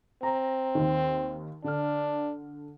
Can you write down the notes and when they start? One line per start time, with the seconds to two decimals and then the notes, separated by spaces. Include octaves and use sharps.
0.23 C4 A#5
0.75 D#2 D#3
1.64 D3 D4 F6